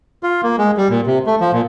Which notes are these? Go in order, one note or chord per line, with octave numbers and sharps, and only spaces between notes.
F4
A#3
G#3
G3
A#2
C3
A3
F3
A#2